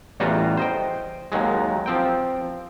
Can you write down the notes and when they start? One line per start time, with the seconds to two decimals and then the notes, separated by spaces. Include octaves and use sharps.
0.20 A1 E2 G3 F4 F#4 A#5
0.57 C5 D#5 G5
1.32 D#2 D#3 F#3 G#3
1.86 F3 C4 G5